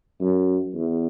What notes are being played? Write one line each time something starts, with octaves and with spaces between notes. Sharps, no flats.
F#2
E2